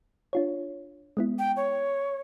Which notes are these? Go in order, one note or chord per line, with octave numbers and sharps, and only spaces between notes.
D4 F4 C#5
G#3 B3 E4
G5
C#5